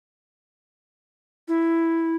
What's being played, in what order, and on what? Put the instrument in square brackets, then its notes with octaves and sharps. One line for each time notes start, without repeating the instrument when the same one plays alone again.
[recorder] E4